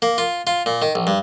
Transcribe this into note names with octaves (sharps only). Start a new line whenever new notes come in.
A#3
F4
F4
A#2
D#3
A#1
G2